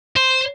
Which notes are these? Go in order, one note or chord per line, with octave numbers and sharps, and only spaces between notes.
C5